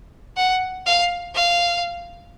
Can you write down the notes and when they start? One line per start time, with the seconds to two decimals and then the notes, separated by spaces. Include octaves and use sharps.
0.37 F#5
0.86 F5
1.35 F5